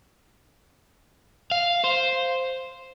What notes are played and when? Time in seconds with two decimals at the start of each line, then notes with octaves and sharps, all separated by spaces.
1.52 F5
1.84 C5